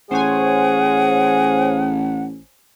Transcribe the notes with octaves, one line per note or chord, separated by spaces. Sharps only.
A1 G#4 C5 C#5 F#5 G#5